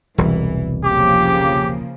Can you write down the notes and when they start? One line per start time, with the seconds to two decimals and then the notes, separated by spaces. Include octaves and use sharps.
0.18 E1 C2 E3
0.84 C#3 F3 A#3 G4 D6